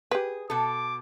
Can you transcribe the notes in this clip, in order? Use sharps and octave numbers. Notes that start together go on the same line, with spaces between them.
G4 G#4 B4
B2 A4 D6